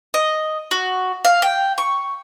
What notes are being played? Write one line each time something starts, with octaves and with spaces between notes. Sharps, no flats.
D#5
F#4
F5
G5
C#6